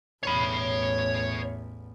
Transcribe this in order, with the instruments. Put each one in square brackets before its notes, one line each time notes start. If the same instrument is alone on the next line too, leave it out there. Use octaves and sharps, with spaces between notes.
[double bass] A1 E2 [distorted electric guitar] C#5 B5